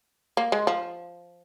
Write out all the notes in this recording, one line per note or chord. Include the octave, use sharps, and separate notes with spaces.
A#3
G#3
F3